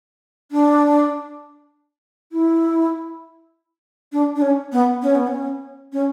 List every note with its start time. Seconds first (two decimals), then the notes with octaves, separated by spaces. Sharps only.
0.51 D4
2.32 E4
4.12 D4
4.36 D4
4.42 C#4
4.72 B3
5.02 C#4
5.15 B3
5.27 C#4
5.93 C#4